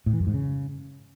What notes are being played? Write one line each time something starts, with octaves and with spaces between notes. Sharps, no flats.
A2
E3
F#2
G#2
C#3